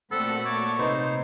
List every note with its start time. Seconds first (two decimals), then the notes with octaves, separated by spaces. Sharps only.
0.12 A#2 A3 C4 F#4 A4 F#5 B5
0.45 C#5 A5 D6
0.79 C3 D#4 B4 C5 C6